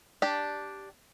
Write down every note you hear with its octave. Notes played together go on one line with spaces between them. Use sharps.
D4 G4 D5